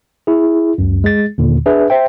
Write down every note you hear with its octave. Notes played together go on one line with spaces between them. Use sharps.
E4 G#4
C#2 F#2
G#3 G#4 A6
D#2 A#2 D3
D4 G#4 B4 E5
C5 E5 G5